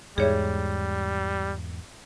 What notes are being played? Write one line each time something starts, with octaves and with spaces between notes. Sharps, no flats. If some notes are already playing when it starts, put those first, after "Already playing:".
E2 G#2 G3 G#4 C#5 E5